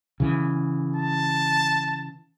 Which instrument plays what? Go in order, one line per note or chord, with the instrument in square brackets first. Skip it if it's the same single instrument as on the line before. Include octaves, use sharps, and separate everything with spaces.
[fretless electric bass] C#3 E3
[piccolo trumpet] A5